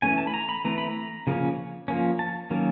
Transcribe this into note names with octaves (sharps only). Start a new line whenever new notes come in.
E3 A3 C#4 G#5
A5
B5
A#5
B5
E3 A3 C4 A#5
B5
A#5
C#3 F3 A#3 C#4
F3 A#3 C#4
A5
D#3 F#3 A#3 C#4